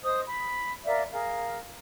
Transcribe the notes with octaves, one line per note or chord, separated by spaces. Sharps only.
C5 D#5 D#6
B5
A#4 D5 E5 F5
G#4 A#4 F5